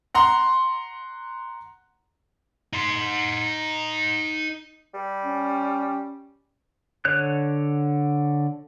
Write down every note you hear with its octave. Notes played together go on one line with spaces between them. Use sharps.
F#5 A#5 C6
D#4 C6
G3
C#4
D3 C#5 F#6